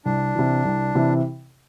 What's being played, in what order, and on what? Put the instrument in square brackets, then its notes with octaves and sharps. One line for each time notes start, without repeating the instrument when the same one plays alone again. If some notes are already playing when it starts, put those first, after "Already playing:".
[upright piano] C2 [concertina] D4
[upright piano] C3 E3
C2
C3 E3